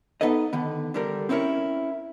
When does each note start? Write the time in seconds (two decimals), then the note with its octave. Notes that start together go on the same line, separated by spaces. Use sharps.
0.21 B3 D#4 A4 B4 D#5
0.53 D3 D#3 B3
0.94 D3 G3 A#4
1.29 C4 C#4 E4 F4 A#4 C#5